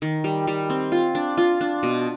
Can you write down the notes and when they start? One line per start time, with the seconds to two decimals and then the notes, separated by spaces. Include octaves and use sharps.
0.02 D#3
0.24 G3
0.47 G3
0.69 C4
0.92 F4
1.15 D4
1.37 F4
1.61 D4
1.83 B2